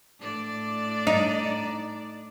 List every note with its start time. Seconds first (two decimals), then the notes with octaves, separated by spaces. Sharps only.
0.20 A2 D4 D5
1.07 D#4